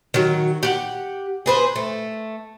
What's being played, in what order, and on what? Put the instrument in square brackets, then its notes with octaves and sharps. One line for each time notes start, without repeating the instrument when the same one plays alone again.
[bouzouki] D#3 F#3
G4 F#5
G#4 B4 C5
A3